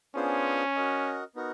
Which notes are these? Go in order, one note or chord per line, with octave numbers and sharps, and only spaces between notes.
B3 C#4 D4 F4 G#4 C5
F#4 A#4 D#5
B3 D#4 F#4 A#4